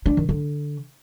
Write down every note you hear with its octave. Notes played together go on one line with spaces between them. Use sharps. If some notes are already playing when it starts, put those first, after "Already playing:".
D4
D#3
D3